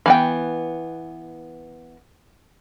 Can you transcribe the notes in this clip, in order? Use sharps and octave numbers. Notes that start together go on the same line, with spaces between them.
E3 B3 G5